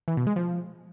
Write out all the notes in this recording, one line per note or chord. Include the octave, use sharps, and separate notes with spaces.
E3
B2
G#3
F3